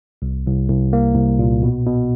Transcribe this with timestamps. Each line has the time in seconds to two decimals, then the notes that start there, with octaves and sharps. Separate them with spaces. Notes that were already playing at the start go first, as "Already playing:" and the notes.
0.22 C2
0.46 C2
0.70 C2
0.93 A#3
1.15 C2
1.39 A#2
1.63 B2
1.86 B2